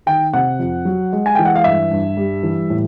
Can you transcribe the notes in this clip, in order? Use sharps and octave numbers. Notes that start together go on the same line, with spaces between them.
D#3 G5
C3 F#5
F2
F#3
G#3
G#5
E3 G5
F#5
F5
G2 E5
G2
G3
E3
A2